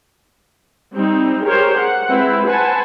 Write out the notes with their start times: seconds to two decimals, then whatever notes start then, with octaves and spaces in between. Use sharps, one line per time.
0.95 G3 C4 D#4
1.44 G4 G#4 A#4 C5 C#5
1.79 F#5
2.10 G#3 C4 E4 B4
2.49 B4 C5 F#5 G#5 A5